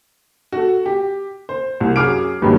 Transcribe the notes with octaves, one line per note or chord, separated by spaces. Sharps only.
F#4 A4
G4
C5
C2
F#2 G#4 D6 F6 D7
A#1 G2 C3 D#3 F#3